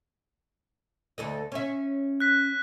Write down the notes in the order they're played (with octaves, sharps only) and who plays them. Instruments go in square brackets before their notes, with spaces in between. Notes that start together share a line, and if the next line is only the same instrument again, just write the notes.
[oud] D2 A4 D#5
C#4 E5
[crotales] F#6 B6